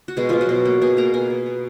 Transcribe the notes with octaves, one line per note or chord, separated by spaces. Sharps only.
F#4
B2 G#3 G#4
B2 F3 F4
F#3 F#4
B2
A#3
B2 G#4 G#5
A#3 A#4 A#5
B2 G#4 G#5
B2
B3